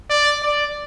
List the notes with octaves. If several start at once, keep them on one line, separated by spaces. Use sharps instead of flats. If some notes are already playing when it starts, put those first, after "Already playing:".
D5
D5